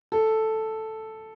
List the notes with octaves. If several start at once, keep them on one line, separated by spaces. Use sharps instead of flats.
A4